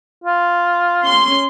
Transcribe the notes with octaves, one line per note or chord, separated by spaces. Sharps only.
F4
C#4 C6